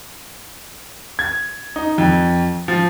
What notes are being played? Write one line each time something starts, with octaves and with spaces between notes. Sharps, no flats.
G#6
D#4
F2
F3